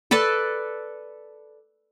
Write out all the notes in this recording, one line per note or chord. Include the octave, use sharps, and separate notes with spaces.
A4 B4 D5 A5